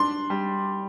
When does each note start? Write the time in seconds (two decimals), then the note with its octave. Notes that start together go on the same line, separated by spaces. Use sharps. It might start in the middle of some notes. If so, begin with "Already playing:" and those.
Already playing: D4 C6
0.30 G3